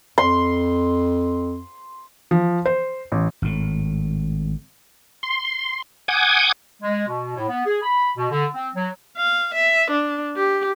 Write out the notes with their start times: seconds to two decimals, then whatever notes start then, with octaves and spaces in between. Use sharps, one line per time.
0.18 F2 C6
2.31 F3
2.66 C5
3.12 A1
3.42 G#1 A2
5.23 C6
6.08 F#5 G#5 D6 D#6 G6 G#6
6.82 G#3
7.08 B2
7.37 A2
7.49 B3
7.65 G#4
7.82 B5
8.17 B2
8.31 D3
8.53 C4
8.76 F#3
9.17 F5
9.54 E5
9.90 D4
10.36 G4